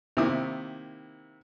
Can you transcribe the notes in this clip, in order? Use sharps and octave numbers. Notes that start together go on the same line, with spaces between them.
C3 D#3 A#3 E4 D#6